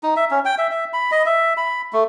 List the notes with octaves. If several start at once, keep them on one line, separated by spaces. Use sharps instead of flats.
D#4
E5
C#4
G5
E5
E5
B5
D#5
E5
B5
A3